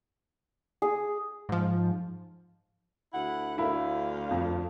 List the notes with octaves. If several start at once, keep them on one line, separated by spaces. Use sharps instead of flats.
G#4
G#2 F3
D2 E4 F#5
D2 E4 A#4 F5 B5
F2